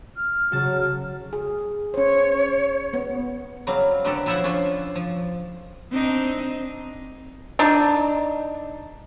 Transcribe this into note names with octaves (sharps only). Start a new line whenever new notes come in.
F6
C#3 F#3 A5
G#4
C#4 C5 C#5
B3
C#3 F#3 G3 C4 F5
D3 F#3 B3 C4 G4 A4
F3 E4 A4 C5 E5 F#5
C#4 D4 F4
F3
C4 D4 D#4
D4 D#4